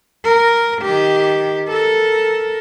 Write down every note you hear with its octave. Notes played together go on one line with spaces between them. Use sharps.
A#4
D#3 G4
A4 A#4